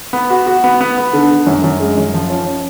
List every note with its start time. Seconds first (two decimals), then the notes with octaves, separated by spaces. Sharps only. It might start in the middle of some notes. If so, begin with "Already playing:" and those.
0.13 B3
0.30 F#4
0.47 F#4
0.64 B3
0.81 B3
0.97 B3
1.13 D3
1.31 D3
1.47 F#2
1.64 F#2
1.80 G#3
1.97 F#2
2.14 F3
2.30 C#4
2.46 C#4